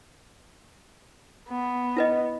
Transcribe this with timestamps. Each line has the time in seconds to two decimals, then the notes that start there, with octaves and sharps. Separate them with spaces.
1.49 B3
1.97 E4 B4 D#5